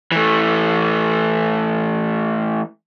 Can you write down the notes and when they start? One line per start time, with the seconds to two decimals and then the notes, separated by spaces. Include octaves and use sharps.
0.12 E3 A3